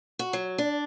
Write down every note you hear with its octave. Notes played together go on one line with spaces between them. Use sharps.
F#4
F#3
D4